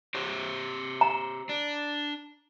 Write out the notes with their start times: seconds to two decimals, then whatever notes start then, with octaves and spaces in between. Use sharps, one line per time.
0.15 G4 C5 C#5
1.01 A#5
1.49 D4